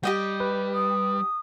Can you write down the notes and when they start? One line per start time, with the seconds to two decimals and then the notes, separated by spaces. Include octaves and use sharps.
0.03 G3 G4 D#5 G5
0.40 B4
0.74 D#6